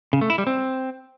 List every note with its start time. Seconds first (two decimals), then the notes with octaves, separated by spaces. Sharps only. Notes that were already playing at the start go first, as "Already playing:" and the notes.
0.13 C#3
0.21 A3
0.30 E4
0.38 G3
0.47 C4